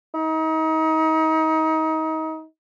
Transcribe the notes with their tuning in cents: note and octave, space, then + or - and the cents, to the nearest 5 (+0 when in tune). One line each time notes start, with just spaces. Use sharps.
D#4 +30